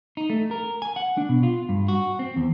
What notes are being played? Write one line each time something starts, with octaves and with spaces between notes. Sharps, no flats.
D#4
A3
A#4
G#5
F#5
D4
B2
F4
G2
F#4
C4
E2